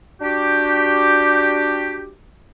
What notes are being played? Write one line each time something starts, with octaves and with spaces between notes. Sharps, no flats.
D4 F#4 G4